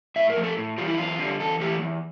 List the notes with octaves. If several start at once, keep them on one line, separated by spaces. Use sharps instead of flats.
A2 E5
A#4
F3 A3
A4
A2
E3 G3 F4
E4
E2 F4
D3 G3
E2 A4
E3 A3 G4
E2